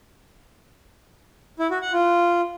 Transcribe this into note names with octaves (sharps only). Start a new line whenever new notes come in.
E4
F#4
F#5
F4